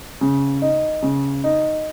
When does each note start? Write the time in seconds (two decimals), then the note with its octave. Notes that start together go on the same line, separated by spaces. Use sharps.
0.21 C#3
0.62 D#4
1.03 C#3
1.44 D#4